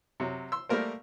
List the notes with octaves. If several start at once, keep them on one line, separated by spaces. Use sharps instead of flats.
C3 F#3
C6 E6
G3 A3 A#3 A#4 C5